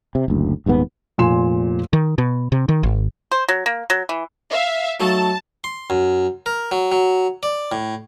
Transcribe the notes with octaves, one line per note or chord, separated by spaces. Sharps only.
C3
F#1 D2
D#1 D#2 G#2 B3
F1 A#2 G#5 C6 E7
D#3
B2
C3
D#3
G#1
C5
F#3
A#3
F#3
E3
E5 F5
F#3 A3 D#4 A5
C6
F#2
A#4
F#3
F#3
D5
A2